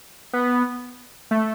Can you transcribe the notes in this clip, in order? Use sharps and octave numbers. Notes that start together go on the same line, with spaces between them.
B3
A3